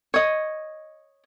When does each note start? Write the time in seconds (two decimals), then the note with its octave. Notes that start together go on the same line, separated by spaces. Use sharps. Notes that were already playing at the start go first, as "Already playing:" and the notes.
0.14 C#5 D#5